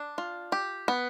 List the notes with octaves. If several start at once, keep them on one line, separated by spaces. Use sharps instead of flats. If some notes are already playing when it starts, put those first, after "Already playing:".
Already playing: D4
F4
G4
B3